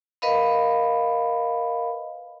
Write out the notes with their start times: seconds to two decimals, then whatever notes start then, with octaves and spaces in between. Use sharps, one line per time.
0.22 A#4 B4 D#5 F5 B5